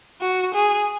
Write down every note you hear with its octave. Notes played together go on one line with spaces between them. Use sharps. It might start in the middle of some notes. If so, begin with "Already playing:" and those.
F#4
G#4